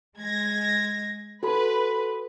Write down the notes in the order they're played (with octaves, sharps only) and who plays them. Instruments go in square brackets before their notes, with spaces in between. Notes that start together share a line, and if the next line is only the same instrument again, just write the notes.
[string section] G#3 G#6 A#6
[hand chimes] F#4 A4 B5 [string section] B4